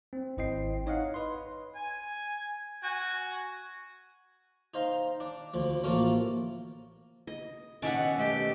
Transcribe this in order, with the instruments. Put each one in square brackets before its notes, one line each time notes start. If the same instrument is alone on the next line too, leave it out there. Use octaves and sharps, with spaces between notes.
[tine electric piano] C4
G#1 E4 C5 D#5 G5 C7
D#4 C#5 D#5 F5 F#5
B4 D#5 C6
[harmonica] G#5
F#4 G#5
[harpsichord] D#4 C5 F5 A#5
D4
D2 F3
A1 F3 A3 A#3 F4
[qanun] D#5
[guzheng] B2 D#3 D5 [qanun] C#4 E5 F#5
[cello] A3 G4